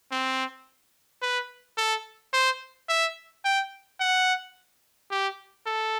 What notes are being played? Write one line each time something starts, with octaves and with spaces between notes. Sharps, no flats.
C4
B4
A4
C5
E5
G5
F#5
G4
A4